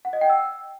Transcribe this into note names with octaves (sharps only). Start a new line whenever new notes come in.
F#5
D#5
G5
E6